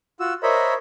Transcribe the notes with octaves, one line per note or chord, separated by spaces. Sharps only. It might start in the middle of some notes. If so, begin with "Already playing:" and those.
F4 F#4 E6
A#4 C5 C#5 D#5 E5 B5